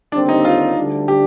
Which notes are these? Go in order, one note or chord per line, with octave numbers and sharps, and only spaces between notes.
D#2 D3 G3 C4 D4
D#4
F4
D2 D3 G3 D4
G4